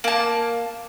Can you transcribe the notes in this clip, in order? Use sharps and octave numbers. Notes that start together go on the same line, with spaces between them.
A#3 A5